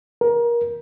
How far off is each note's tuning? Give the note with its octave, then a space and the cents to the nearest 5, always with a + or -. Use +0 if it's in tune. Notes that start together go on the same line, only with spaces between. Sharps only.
A#4 +25